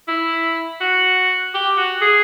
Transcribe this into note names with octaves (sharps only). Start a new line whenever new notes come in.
E4
F#4
G4
F#4
G#4